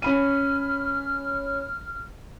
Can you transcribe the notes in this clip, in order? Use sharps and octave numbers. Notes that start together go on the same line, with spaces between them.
C#4 B5 F6 D#7